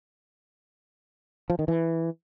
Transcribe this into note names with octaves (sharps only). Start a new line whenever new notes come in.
F3
D#3
E3